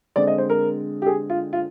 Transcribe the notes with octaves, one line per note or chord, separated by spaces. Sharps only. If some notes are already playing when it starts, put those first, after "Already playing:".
D3 G#3 C4 D5
D#5
C5
A#4
G4
G#4
F4
F4